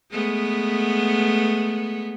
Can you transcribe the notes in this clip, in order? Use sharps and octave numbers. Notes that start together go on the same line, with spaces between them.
G#3 A3 B3